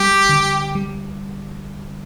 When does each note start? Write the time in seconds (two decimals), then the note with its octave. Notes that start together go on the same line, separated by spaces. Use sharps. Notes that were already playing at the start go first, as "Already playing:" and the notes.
Already playing: G3 G4
0.29 D3
0.75 G3